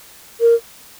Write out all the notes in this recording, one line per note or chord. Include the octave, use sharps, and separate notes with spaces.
A#4